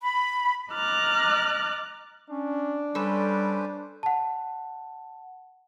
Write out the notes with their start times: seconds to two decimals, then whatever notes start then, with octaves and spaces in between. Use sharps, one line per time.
0.01 B5
0.72 D#5 A#5 D6 F6 F#6 A6
2.30 C#4 D4
2.95 G3 C#4 A4 B4 C5
4.03 F#5 A5